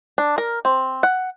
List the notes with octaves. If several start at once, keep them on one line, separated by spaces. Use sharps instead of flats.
D4
A#4
C4
F#5